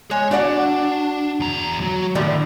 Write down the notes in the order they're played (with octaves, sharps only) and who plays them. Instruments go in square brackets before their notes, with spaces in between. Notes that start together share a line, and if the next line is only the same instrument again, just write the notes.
[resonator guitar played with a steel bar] G#3 [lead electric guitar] C#5
[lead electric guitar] D4 [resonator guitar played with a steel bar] F#4 D5 F#5
[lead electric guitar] E2 A#5
F#3 F#4
[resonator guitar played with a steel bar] A2 D3 G3 [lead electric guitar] D#3